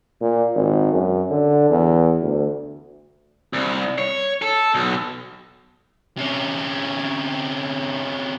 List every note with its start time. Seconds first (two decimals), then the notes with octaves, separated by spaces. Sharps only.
0.21 A#2
0.55 G#1
0.93 F#2
1.30 D3
1.70 E2
2.22 D2
3.53 C2
3.98 C#5
4.42 A4
4.74 B1
6.17 C3 C#4